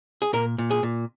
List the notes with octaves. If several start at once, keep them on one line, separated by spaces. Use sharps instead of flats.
G#4
A#2 A#4
A#2
G#4
A#2